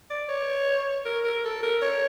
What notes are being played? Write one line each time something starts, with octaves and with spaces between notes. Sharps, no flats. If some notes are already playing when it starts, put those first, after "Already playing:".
D5
C#5
A#4
A#4
A4
A#4
C#5